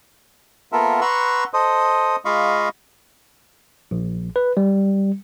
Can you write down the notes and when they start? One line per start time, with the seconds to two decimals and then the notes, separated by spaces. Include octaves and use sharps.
0.72 A#3 B3 F4 A4 A#4 E5
1.01 B4 F#5 A#5 C6 C#6 E6
1.54 A4 C5 D#5 D#6
2.25 G#3 F4 D#5 F5 B5 C#6
3.91 A#1
4.36 B4
4.57 G3